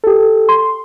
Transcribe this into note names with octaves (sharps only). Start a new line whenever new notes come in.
G4 A4
C6